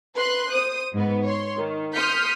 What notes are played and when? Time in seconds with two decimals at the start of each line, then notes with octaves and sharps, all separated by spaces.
0.16 B4 C6 F#6
0.50 C5 D#6
0.93 G#2 B3
1.25 C#5 C6
1.58 D#3
1.94 C6 D#6 F6 G6 B6 C#7